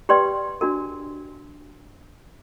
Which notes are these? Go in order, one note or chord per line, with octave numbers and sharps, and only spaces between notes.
G4 B4 D5 G5 C6
D4 F#4 A#4